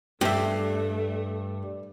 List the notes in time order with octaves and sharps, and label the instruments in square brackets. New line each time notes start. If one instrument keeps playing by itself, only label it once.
[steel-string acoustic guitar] G2 [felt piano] G3 [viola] A3 [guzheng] G4 E5